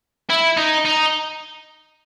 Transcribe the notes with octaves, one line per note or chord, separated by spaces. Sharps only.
E4
D#4
D#4